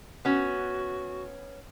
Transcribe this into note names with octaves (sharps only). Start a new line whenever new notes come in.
B3 C#4 F#4